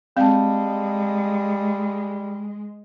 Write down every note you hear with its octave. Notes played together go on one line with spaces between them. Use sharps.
G3 G#3 C4 F5 A5